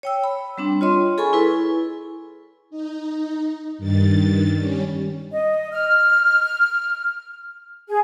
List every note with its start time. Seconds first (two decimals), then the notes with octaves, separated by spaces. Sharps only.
0.03 C#5 G5 E6
0.24 B5
0.58 G3 C4 D4
0.81 F4 C#5 D#5 C6
1.18 G#4 A4 G#5 B5 C#6
1.33 E4 B4
2.70 D#4
3.78 G2 D#3 A6
4.55 G3 C#4
5.32 D#5
5.72 F6
7.88 G#4